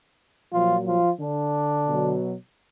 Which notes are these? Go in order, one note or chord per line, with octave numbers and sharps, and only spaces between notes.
A#2 F3 F#3 F4
F3 F4
D3 D4
B2 F#3